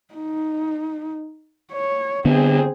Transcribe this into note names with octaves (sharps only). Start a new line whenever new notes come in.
D#4
C#5
D3 B3 C4 G#4